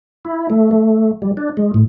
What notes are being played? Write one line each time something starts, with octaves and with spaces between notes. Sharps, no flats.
E4
A3
A3
G3
D4
G#3
A2